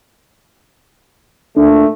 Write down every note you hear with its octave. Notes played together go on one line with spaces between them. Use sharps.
A#2 A3 D4